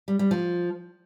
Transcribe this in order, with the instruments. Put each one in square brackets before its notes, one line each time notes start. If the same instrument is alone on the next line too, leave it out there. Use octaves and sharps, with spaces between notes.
[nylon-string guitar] G3
G3
F3